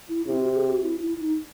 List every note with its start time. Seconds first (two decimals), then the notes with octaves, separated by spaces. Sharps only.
0.09 E4
0.27 C3 E4
0.42 F#4
0.49 G4
0.55 G#4
0.69 F#4
0.83 E4
1.01 E4
1.20 D#4